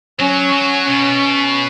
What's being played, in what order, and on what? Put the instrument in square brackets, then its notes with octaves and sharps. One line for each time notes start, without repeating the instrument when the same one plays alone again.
[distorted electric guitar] F#3 [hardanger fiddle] C#4
[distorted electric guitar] F#3
[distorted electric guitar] B2 [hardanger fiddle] C#4